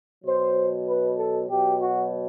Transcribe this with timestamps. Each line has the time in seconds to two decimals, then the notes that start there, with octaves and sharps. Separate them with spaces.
0.24 B2 F#3 C5
0.87 B4
1.17 A4
1.49 B2 F#3 G4
1.80 F#4